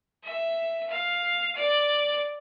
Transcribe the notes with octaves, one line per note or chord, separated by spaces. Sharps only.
E5
F5
D5